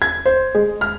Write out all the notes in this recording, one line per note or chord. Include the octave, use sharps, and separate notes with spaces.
G#6
C5
G#3
F6